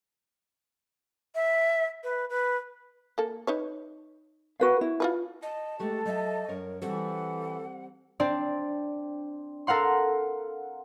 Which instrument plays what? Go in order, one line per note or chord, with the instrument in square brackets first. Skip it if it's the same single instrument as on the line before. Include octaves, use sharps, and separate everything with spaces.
[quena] E5
B4
B4
[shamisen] A#3 A4
D#4 B4 C#5
[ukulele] F#4 B4 F5
E4
[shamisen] F4 F#4 B4
[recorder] D#5 [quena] A5
[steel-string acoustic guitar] G#3 A3 F#4 [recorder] G4 [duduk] A4
[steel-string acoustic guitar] F#3 E5 [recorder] D#5
[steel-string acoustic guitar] F#2 C#5 [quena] A#4
[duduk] E3 [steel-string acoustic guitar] G3 C4 F#4 [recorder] A4 [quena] F#5
[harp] C4 D4 D5
A4 A#4 F5 F#5 C6